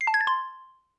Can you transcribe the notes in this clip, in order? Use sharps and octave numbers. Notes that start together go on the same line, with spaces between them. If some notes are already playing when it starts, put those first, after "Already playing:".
C7
A5
G#6
A6
C6